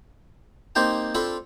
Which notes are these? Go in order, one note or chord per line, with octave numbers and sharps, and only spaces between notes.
A#3 C4 D#4 G4 C5 A5
C4 D4 F4 A4 A5 B5